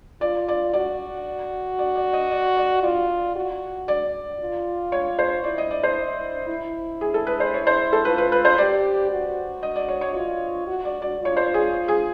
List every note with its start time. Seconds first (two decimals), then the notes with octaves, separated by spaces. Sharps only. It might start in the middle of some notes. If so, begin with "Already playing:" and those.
0.21 F4 D5
0.48 D5
0.73 F#4 D5
1.79 D5
1.96 D5
2.13 D#5
2.31 D5
2.57 D5
2.83 F4 D5
3.35 F#4
3.88 D5
4.40 F4
4.92 C#5
5.19 C5
5.44 E4 D5
5.58 D#5
5.71 D5
5.83 C5
6.49 E4
7.01 G#4
7.14 A4
7.27 B4
7.40 C5
7.54 C#5
7.67 C5
7.93 A4
8.05 F4 B4
8.18 B4
8.32 B4
8.45 C5
8.58 G4 D5
9.10 F#4
9.63 D#5
9.76 D5
9.88 C#5
10.01 C#5
10.15 F4
10.67 F#4
10.85 D5
11.02 D5
11.20 F4
11.25 C#5
11.37 C5
11.54 G#4
11.88 G#4